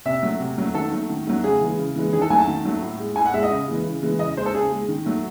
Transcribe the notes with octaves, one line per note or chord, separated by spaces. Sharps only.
C3 E5
F#3 A3
C3
F#3 A3
D#3 A4
F#3 A3
D#3
F#3 A3
C#3 G#4
E3 G#3
C#3
E3 G#3
D#3 G#4
A4
F#3 A3 G#5
A5
D#3
F#3 A3
A2
G#3
A2 G#5
F#5
G#3 E5
D#5
C#3
E3 G#3
C#3
E3 G#3
C#3 D#5
G#3 C5
A4
C#3 G#4
G#3
D#3
F#3 A3